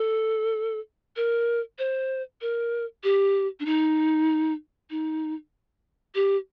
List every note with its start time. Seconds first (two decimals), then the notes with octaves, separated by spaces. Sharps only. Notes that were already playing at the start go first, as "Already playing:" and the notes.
Already playing: A4
1.16 A#4
1.79 C5
2.41 A#4
3.04 G4
3.60 D4
3.66 D#4
4.90 D#4
6.15 G4